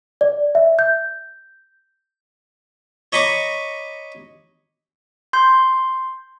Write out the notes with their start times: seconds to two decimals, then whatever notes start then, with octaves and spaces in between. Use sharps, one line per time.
0.21 D5
0.55 E5
0.79 G6
3.12 C#5 D#5 A#5 B5 C#6 D6
5.33 C6 G6